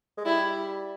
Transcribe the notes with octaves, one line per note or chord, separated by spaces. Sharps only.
G#3
G3 E4